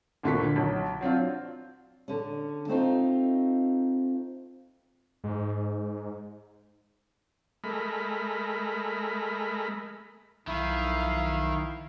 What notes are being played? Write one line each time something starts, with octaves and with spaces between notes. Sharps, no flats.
D2 A#2 D3 F#4 C#6 B6
B1
F#3 C4 D4 F4
D3 C#4
A3 C4 D#4 F4
G#2
G#3 A3 A#4 B5
B1 D#3 F3 E4 F5